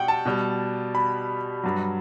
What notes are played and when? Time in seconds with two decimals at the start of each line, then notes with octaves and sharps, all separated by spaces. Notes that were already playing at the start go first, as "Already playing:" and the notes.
Already playing: B2 G3 F#5 G5
0.08 A5
0.25 B2 G3
0.95 B5
1.63 G2 F#3